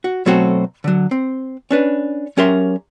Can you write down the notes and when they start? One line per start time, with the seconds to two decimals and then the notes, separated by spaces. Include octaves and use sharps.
0.04 F#4
0.26 B2 F#3 A3 C4 F#4 A4
0.84 D3 F#3
1.11 C4
1.71 C#4 D4 B4
2.37 F#3 C#4 G4 A#4 E5 C6